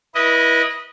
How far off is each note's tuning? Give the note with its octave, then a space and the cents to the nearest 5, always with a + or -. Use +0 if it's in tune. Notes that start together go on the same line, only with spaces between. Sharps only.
E4 +0 B4 -30 D#5 +0